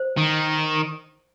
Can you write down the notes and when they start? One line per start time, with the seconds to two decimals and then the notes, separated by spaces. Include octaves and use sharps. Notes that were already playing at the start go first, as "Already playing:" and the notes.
Already playing: C5
0.17 D#3